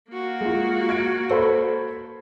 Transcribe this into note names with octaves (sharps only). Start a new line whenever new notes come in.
A#3 F#4
G#3 F4
G#6 D7
A4 C5 B5